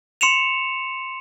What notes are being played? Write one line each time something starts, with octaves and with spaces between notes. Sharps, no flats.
C6 C#7 E7 F7